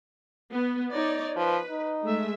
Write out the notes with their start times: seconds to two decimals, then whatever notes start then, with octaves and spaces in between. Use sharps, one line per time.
0.51 B3
0.93 D#4 C#5 D5
1.36 F3 B4
1.70 D#4
2.03 G#3 A3 E5